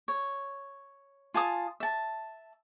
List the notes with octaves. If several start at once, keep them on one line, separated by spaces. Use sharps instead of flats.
C#5
F4 G#5 A5 D#6
E5 A5